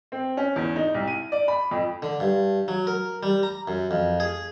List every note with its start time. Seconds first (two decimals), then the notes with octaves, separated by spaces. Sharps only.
0.12 C4
0.37 C#4
0.56 E2
0.76 D#4
0.94 C2
1.08 D#7
1.32 D5
1.48 B5
1.71 F2
2.02 D3
2.20 G2
2.68 F#3
2.87 A#4
3.23 G3
3.43 A#5
3.68 F#2
3.91 F2
4.20 G#4